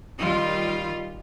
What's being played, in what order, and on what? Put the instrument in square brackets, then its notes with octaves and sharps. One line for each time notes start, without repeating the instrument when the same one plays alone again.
[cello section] D#3 G3 F4